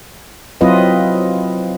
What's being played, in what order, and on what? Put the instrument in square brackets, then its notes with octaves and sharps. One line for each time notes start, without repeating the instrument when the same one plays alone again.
[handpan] F#3 C4 E4 F4 B4 D#5